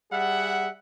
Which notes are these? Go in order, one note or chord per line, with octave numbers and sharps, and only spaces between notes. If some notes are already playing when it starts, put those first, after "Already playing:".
G3 G#4 E5 F#5